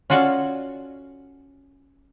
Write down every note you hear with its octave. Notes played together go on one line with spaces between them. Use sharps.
C#4 F4 F#4 A4 D5